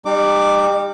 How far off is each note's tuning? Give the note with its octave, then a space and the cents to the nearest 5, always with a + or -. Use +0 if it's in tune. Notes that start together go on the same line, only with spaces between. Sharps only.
G3 +25 D#4 -40 D6 +0